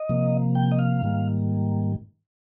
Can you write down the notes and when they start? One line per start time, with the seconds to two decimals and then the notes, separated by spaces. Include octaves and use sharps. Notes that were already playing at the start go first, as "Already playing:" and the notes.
Already playing: D#5
0.09 C3 F3 A#3
0.55 G5
0.72 D#5
0.79 F5
1.02 G#2 D#3 G3 A#3